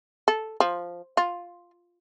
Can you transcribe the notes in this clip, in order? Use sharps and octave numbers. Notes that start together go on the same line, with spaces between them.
A4
F3
F4